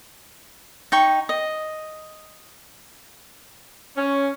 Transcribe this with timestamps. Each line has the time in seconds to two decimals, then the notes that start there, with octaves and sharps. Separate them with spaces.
0.92 D#4 G5 C#6
1.29 D#5
3.97 C#4